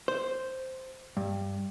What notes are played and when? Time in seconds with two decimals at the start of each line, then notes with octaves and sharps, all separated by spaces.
0.08 C5
1.17 G2